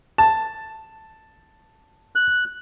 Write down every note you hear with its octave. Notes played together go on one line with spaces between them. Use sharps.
A5
F#6